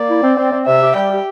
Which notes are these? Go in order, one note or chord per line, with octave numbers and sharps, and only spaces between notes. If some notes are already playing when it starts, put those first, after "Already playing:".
Already playing: A#3 D5
E4
C4
C4
C4
C3 E5
G4
G3 G5
G4